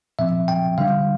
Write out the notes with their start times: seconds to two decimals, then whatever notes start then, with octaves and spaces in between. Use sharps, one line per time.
0.19 A#2 F3 C4 E5
0.48 G5
0.78 D3 G3 D4 F5